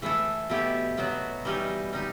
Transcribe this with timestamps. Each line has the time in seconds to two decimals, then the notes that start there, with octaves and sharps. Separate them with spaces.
0.02 E3 A3 E4 A4
0.50 B2 A3 E4 G4
0.97 B2 F#3 B3 F#4
1.45 E3 G3 D#4
1.93 G3 D#4